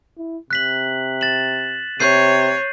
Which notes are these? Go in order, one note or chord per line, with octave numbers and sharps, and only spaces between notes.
E4
C3 F#6 B6 F#7
A6 E7 F#7
C3 C#5 G6 C7 D#7